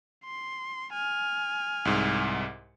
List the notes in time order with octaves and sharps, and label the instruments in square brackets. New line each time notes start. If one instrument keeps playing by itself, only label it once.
[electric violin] C6
G#5 F6
[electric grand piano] C2 G#2